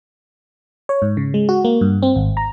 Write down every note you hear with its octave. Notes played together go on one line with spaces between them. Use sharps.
C#5
G#2
C#3
G#3
F#4
A#3
G2
C4
G#1
A#5